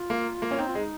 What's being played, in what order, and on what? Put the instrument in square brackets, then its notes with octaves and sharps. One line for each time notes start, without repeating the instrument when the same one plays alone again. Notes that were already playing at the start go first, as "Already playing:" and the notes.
Already playing: [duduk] F4
[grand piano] A#3
A#3
C#4
[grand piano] C4 [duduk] D#4
[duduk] F4
[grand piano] G#3 [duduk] D#4